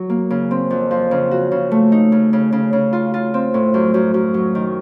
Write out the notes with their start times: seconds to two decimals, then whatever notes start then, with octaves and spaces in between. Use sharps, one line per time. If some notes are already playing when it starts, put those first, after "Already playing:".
Already playing: F#3
0.10 A#3
0.30 C#3
0.51 C4
0.70 F2
0.91 F3
1.11 C#3
1.31 F#4
1.52 C#3
1.71 A3
1.92 D#4
2.12 C#3
2.33 C#3
2.53 C#3
2.73 C#3
2.93 F4
3.14 F4
3.34 C4
3.54 A2
3.74 F#2
3.94 F#2
4.14 F#2
4.34 F#3
4.55 D#3